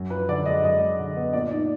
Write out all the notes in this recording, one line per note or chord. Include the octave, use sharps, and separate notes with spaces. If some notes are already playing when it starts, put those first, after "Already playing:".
Already playing: F#2
F3 B4
D3 D5
G#3 D#5
F#2 D#5
G#3
D3
B3
A#2 D5
D#4 D5